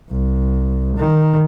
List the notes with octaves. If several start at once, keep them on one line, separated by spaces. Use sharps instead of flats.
C2
D#3